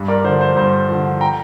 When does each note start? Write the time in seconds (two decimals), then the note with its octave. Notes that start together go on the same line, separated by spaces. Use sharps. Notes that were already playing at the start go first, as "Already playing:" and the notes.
Already playing: G2
0.08 A#4 D5
0.24 D3 C5
0.27 F3
0.41 C5
0.56 G2 C5
0.89 D3 F3
1.21 G5 A#5